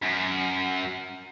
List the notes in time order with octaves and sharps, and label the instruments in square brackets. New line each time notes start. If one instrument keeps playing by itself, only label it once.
[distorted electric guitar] F#2